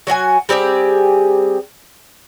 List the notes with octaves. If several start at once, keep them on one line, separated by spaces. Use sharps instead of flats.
F#3 F#4 F#5 G#5
G3 C4 G4 G#4